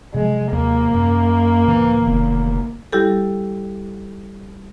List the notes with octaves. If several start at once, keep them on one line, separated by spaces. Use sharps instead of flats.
C3 F3 F#3 G#3
D#2 A#3
F#2
C#2 A2 D3 E3
F1 D3 D#3 B3
G3 E4 G4 A4